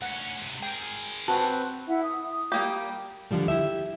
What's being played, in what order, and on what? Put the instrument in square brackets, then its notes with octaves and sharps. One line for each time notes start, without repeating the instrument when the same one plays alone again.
[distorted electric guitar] D2 C#4 [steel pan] F#5
[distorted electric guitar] G#2 C3
[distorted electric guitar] G#4 A#4 [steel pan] G5
[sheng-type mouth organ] C4 B4 [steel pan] F#4 [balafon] A5
[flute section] E4 E5 F#5
D#6
[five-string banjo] G3 A#3 G4
[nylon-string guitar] D3 D#3 F3 G3 A3
E4 G4 E5